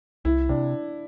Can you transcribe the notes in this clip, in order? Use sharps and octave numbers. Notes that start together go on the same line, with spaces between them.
C2 E4
C3 D4